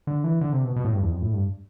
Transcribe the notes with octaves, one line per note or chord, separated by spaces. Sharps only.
D3
E3
D3
C3
B2
B2
A2
G2
E2
F2
A2
G2